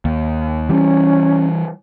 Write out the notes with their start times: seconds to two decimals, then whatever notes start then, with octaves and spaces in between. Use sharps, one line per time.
0.05 D#2
0.69 E3 G3 C#4